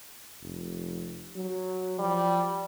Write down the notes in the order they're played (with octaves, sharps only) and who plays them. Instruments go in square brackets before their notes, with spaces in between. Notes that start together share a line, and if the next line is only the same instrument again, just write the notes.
[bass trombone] F1
F#3
[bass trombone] F3 [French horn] G3